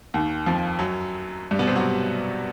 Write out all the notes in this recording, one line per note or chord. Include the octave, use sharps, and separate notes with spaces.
D#2 D#3
F2 F3
F#2 F#3
G2 G3
B2 B3
C3 C4
F#3 F#4